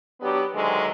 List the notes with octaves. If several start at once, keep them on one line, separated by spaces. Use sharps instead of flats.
F#3 B3 D4 G4
D2 D3 D#3 F#3 G#3